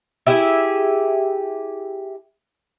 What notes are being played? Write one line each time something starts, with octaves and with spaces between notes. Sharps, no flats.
E4 G4 G#4 E5